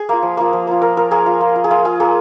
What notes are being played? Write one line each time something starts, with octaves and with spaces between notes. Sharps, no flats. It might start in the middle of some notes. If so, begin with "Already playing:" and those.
Already playing: G#4
A#3 F4
F3
A#3 F4
F3
A#3 F4
A#3 A#4
F4 A#4
A#3 G#4
F4
A#3
F4
G#4
A#3 F4
F4 G#4
A#3 G#4